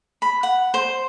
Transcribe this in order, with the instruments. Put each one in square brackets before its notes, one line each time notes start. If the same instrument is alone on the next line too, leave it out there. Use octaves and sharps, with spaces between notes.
[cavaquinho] B5
F#5
C5